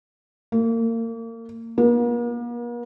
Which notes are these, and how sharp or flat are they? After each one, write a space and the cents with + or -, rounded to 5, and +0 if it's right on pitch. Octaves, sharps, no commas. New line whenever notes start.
A#3 -30
A#3 +45